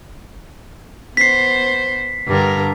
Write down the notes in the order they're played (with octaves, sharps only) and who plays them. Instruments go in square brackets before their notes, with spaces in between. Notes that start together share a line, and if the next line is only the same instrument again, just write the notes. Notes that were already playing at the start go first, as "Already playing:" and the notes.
[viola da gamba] B3 C5 [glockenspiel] B6 C7
[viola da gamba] G2 D3 A#4